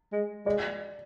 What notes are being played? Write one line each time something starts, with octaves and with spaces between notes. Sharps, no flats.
G#3
G#3 D5